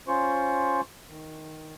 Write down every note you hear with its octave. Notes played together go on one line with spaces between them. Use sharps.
C#4 F4 C5 C#6
D#3